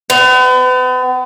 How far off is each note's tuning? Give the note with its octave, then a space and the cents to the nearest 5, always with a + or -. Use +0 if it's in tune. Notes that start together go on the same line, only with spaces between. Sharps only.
B3 +40